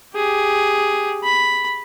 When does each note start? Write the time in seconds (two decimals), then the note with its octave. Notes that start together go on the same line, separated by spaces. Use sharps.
0.15 G4 G#4
1.24 B5